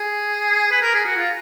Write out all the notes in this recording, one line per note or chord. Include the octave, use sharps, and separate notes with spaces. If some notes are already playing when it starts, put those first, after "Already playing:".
Already playing: G#4
B4
A#4
G#4
F#4
F4